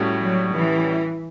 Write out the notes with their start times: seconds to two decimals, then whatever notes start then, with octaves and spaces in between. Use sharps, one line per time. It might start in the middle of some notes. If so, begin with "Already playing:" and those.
Already playing: A2 G3 C#4 F#4
0.20 F#3
0.54 E3